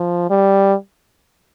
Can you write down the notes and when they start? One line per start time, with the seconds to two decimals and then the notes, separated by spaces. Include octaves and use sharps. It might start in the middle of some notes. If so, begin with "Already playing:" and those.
Already playing: F3
0.30 G3